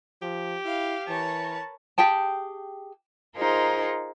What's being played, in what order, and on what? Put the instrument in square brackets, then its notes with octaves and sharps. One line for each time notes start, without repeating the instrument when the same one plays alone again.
[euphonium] F3 [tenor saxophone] G4
[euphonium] E4 [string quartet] F5
[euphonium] E3 [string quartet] A#4 B4 C#5 [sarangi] A5
[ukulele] G4 G#4 G5 A5
[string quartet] D#4 F4 G#4 A#4 C5